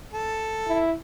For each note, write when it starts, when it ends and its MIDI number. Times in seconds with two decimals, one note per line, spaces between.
0.13 0.81 69
0.67 0.93 64